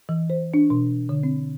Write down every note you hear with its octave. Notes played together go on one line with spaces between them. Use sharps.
E3
C5
D4
B2
D3
C4